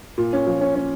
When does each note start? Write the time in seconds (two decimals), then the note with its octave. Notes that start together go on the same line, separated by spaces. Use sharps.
0.18 A#2
0.33 C#4
0.47 F3
0.61 C#4
0.75 C#4